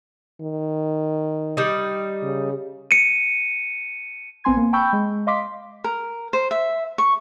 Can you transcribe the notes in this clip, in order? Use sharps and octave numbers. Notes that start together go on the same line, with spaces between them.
D#3
G3 D#4
C#3
C#7 D#7
A1 B3 C4 G#5 C6 G#6
A#3
G5 A5 B5 C#6 E6 G6
G#3
D#5 F5 C6 D6 B6
A#4
C5
E5
C#6